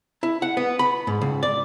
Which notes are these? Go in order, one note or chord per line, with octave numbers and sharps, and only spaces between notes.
E4
F#5
B3
B5
G#2
C#2
D5